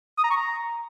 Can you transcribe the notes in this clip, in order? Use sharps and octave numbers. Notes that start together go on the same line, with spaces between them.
D#6
A#5
C#6
A#5